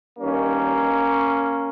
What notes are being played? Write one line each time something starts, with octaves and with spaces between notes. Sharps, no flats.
G2 D#3 A#3 C#4